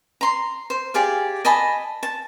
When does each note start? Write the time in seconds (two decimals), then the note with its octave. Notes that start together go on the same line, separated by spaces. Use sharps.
0.21 A#5 C6
0.70 C5
0.94 G4 G#4 D5 F5
1.45 D#5 G#5 A5 B5
2.03 A5